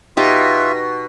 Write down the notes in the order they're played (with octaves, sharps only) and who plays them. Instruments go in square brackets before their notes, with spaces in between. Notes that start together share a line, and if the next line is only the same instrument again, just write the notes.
[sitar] B2 [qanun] D#4 G4 [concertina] F4 E5